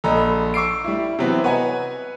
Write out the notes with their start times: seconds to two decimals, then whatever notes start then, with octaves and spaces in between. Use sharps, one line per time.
0.04 A#1 A4 D#5 A#5 B5
0.54 C#6 D6 E6 C7 D7
0.84 G3 E4
1.19 C3 E3 F#3 B3 C4
1.44 B4 C#5 D#5 F#5 G#5 A#5